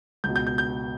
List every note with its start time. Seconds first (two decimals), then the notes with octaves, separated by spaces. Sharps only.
0.24 C#2 G6
0.28 B2
0.36 G6
0.47 G6
0.58 G6